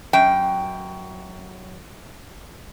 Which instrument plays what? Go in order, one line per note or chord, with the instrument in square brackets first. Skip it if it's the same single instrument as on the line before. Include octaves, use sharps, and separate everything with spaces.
[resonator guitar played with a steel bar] F#2 G5